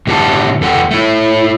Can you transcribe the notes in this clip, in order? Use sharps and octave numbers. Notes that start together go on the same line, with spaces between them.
A2 D3 G4 B4 F#5 A5
E2 A4 F#5 G5
A3 E4